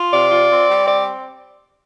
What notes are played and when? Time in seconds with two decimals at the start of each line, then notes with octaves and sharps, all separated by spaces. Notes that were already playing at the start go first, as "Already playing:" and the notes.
Already playing: F4
0.11 C3 D5
0.30 F4
0.49 C4
0.67 G3
0.85 C4 D5